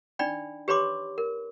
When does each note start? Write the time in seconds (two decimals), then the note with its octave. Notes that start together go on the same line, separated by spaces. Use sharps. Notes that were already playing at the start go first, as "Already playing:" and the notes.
0.19 D4 D#4 D5 G5 B5
0.68 G4 B4 C#5 B5 C6 D6
1.18 A#4